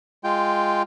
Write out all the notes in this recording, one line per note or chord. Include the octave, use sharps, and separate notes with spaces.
G#3 F4 G5